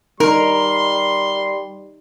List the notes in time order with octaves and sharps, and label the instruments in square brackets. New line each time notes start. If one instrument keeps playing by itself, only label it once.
[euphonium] G3 [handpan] D#4 [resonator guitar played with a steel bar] A#4 [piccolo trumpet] C6